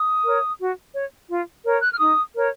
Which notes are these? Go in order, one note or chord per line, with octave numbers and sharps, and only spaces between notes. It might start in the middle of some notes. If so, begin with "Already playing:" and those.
Already playing: D#6
A#4 C#5
F#4
C#5
F4
A#4 C#5
F#6
F6
D#4 D#6
A#4 C#5